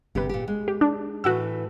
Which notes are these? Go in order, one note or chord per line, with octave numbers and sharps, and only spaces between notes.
G1 C3 G4 B4
A#2 G4
G#3
G4
D4
A2 E3 F#4 F#5 E6